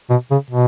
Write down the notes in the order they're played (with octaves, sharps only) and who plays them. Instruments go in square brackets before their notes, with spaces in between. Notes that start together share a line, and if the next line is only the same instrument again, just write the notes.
[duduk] B2
C#3
B2